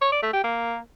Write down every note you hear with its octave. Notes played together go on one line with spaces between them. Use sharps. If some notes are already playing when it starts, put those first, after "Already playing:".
C#5
D5
A3
G4
A#3